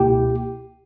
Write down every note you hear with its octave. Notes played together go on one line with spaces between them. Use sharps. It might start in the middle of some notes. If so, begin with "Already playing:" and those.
Already playing: C#2 B2 A#3 E4 G4 G5